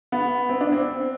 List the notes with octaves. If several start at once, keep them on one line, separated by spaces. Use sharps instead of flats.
B3
C4
D4
C4